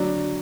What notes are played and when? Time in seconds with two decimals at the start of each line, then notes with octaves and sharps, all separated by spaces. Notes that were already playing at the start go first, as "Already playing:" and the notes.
Already playing: F#3 D4